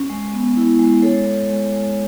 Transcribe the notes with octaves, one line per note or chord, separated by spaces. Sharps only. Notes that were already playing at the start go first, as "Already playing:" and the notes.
Already playing: C#4
G#3
B3
E4
G#3
G#3 A4 C#5
G#3
G#3
G#3